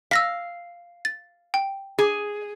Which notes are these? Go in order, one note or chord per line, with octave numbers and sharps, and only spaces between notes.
F5 E6 A#6 B6
A6
G5
G#4